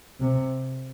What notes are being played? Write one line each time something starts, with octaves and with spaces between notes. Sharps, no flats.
C3